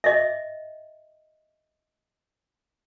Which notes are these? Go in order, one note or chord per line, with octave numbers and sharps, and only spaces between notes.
D#5 E5